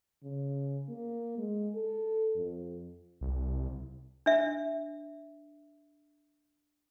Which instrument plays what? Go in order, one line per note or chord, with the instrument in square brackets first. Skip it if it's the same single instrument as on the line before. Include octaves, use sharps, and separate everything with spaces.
[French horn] C#3
A#3
G#3
A4
F2
[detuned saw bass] C2
[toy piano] D4 E5